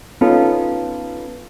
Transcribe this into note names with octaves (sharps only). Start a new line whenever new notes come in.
B3 C#4 D#4 F4 A4